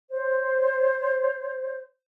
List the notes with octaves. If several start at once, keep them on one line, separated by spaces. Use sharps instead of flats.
C5 C#5